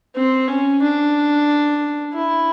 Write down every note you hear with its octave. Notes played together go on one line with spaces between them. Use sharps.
C4
C#4
D4
E4